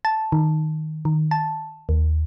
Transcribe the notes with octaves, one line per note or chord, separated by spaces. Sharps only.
A5
D#3
D#3
A5
D#2